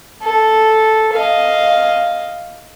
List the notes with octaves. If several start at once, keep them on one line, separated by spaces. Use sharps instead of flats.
A4
D#5 F5